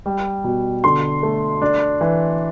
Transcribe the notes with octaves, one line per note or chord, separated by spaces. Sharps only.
G3
B2
D3 C6
A3
D4
E3